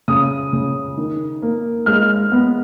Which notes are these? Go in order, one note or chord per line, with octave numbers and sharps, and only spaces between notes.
C#3 D#6
C#3
D#3
A#3
G#3 F6
B3